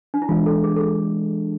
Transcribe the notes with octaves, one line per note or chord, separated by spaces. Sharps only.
D4
E4
E3 G#3 D4 F4
A4
G#4
A4
G#4